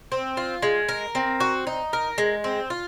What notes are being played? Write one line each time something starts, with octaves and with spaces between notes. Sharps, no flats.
C4
F4
G#3
A#4
C4
F#4
D#4
A#4
G#3
C4
F4